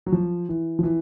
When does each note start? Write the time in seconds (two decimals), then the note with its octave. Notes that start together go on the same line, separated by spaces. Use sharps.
0.06 F#3
0.12 F3
0.49 E3
0.79 F3
0.83 E3